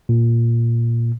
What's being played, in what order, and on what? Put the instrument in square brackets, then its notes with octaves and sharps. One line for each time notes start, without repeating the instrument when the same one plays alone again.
[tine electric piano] A#2